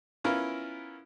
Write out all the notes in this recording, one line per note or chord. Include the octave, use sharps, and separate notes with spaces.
B3 C#4 E4 F4 A#4 B4